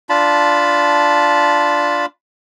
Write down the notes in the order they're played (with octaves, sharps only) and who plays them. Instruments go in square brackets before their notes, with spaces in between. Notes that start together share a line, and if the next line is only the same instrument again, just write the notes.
[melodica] D4 F4 A5 B5